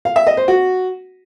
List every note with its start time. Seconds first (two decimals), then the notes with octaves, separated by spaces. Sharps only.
0.05 F5
0.16 E5
0.27 D#5
0.37 C5
0.48 F#4